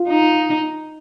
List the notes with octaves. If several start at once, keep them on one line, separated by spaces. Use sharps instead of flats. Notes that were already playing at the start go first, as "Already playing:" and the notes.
Already playing: F4
D#4